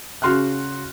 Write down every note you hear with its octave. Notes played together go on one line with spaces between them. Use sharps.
C#3 F#4 C6 F6 F#6